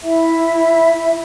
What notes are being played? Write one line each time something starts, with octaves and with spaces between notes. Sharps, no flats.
E4 E5